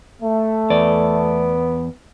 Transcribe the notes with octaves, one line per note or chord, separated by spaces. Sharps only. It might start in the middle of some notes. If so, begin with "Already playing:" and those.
A3
E2 B3 D5